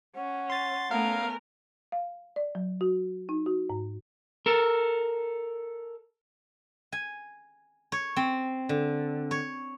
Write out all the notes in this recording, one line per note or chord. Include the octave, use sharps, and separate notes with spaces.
C#4 F#5
C6 A6
A3 B3 C#4 A#4 F5
F5
D5
F#3
F#4
D#4
F#4
G#2
A4 A#4
G#5
C#5
C4
D3
C#5